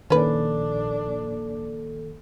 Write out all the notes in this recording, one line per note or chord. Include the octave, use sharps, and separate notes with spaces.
A#1 D#3 A#3 C#4 D4 A4 B4